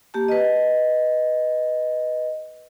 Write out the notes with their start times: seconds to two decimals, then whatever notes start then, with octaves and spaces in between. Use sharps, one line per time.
0.14 A#3 G4 A5
0.28 B4 D#5